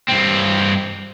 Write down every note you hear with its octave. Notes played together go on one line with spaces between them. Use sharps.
G2 C4